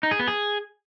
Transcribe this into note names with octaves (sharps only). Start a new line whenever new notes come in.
D#4
G#4
B3
G#4